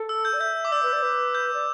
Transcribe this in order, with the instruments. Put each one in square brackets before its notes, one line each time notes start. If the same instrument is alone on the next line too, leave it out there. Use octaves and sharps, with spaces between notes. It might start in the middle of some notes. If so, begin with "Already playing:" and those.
Already playing: [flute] A4
[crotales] E6
G6
[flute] D5
[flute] E5 [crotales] G6
[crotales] D6
[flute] D5 [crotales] E6
[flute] B4
D5
B4
[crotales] G6
[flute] D5